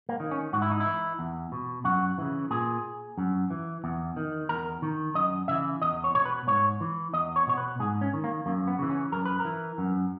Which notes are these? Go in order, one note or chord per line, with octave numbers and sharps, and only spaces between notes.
A#3
D#3
C#4
G#2 F#4
E4
D#4
E4
E3
E2
B2
F#2 F#4
C#3 E3
A#2 G#4
F#2
E3
E2
D#3
E2 A#4
D#3
F#2 D#5
C#3 E3 E5
E2 D#5
C#5
B2 C#5
B4
G#2 C#5
E3
E2 D#5
C#5
B2 C#5
B4
G#2 G#4
C#4
D#3
A#3
F#2 A#3
B3
C#3 E3
C#4
F#2 A#4
B4
A#4
E3
F#2